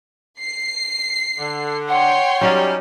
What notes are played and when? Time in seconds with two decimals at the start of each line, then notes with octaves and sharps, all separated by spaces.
0.40 C7
1.39 D3
1.89 C#5 F#5 G5 C6
2.41 F#3 G3 C#4 D#4 D5